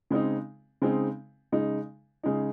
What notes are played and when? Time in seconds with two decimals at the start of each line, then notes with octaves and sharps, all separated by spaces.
0.11 C#3 G#3 C4 D#4
0.82 C#3 G#3 C4 D#4
1.52 C#3 G#3 D#4
2.23 C#3 G#3 D#4